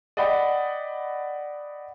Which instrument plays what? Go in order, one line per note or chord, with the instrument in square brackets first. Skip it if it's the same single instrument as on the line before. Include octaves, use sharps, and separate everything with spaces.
[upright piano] D5 D#5 F#5 G5 B5